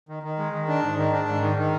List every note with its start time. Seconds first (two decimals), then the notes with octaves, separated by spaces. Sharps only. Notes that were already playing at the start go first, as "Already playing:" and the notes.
0.09 D#3
0.23 D#3
0.38 G#3
0.53 D#3
0.68 D4
0.83 G#2
0.98 D#3
1.13 D4
1.28 G#2
1.42 D#3
1.57 D#3